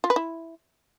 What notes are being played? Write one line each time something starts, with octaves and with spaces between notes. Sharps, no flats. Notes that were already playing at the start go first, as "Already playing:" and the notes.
F4
B4
E4